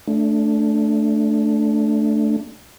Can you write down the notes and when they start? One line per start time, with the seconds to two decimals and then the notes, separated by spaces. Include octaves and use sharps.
0.07 A3 D4